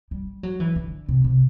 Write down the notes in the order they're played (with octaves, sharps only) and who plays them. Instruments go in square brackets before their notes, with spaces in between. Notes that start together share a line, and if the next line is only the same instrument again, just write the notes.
[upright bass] G3
F#3
E3
D3
C3
C3